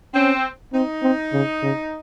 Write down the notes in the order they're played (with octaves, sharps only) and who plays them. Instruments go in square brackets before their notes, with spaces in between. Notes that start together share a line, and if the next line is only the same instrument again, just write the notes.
[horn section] C4 [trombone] C#4
[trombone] C4 [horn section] D#4
[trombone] C4
C#3
C#3